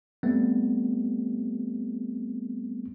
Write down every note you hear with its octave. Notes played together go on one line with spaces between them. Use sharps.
G3 A3 B3 C4